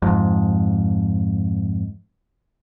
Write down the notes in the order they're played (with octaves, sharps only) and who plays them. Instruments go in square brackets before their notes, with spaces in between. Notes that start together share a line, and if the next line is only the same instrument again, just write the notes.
[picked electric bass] F2 G#2